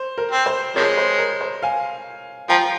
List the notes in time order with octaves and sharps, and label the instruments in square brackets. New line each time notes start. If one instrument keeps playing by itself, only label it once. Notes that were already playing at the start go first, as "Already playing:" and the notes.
Already playing: [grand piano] C5
A#4
[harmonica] C4
[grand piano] C5
[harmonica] C3 F3 G#3 [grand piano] A#4 C#5
[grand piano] C5
A#4
C5
F5 G#5
[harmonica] F3 [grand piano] G5 A#5